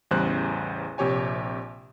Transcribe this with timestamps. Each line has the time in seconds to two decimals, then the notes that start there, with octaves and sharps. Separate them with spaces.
0.11 A1 E2 C#3 G3 C5 F#6
0.98 A#1 C3 G4 C#5 G#5